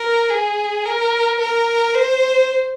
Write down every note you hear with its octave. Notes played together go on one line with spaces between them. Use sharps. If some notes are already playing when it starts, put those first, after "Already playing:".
Already playing: A#4
G#4
A#4
A#4
C5